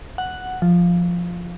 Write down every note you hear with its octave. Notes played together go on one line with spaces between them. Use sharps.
F#5
F3